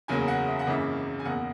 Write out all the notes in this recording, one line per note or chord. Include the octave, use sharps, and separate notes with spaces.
F#1 E2 C#3 F#3 A#3 G#5
F#5
E5
F#5
G#1 F#2 C#3 E3 A#3 E5
G#5
F#1 E2 B2 A#3 F#5